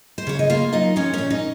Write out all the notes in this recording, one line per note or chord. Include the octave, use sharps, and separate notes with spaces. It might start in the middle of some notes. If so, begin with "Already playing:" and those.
C5
C#3 C#5
D#5
A#3 F4 F5
F#3 D#4 D#5
F3 C#4 C#5
A#2 C#4 C#5
D#4 D#5